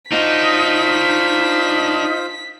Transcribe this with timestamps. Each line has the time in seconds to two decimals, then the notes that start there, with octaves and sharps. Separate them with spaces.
0.12 D4 D#4 F4 F#4 C5 B6